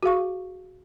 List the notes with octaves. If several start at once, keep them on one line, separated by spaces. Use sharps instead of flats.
F#4 G#4 F5 C#6